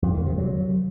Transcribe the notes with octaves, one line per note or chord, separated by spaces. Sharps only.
F2
D#3
C3
F#3